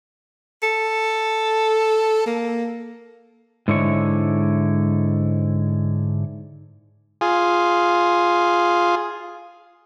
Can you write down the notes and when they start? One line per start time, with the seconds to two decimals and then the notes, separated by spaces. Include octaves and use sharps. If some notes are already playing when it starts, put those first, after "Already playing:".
0.63 A4
2.26 A#3
3.68 G#2 D3 E4 C#5
7.21 F4 G#4